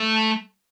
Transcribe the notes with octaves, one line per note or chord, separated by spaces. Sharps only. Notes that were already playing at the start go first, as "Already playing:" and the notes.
Already playing: A3